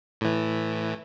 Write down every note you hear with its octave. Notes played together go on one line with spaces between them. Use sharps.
A2 E3